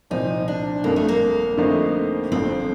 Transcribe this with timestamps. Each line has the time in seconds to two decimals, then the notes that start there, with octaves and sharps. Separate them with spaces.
0.10 C2 A#2 F3 C4 D#4
0.48 D4
0.84 G1 F2 D3 A#3
0.96 A3
1.08 A#3
1.58 F2 D3 F3 A3 D#4
2.32 G1 F2 D3 F3 C4